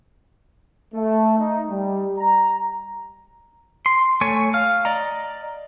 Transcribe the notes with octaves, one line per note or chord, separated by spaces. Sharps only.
A3
D#4
G3
A#5
C6
A3 C#5 G#5
F5 F6
D5 D#5 A#5